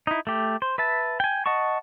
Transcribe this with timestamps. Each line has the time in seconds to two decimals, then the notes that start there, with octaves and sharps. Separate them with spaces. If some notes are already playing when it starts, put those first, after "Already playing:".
0.07 D#4 E4
0.27 A3 G4
0.62 C5
0.78 B4 E5 A5
1.20 G5 G#5
1.46 D#5 F#5 A5 C#6